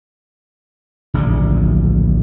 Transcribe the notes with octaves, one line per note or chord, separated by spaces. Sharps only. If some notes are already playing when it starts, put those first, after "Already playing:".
D1 A#1 A#2 C#3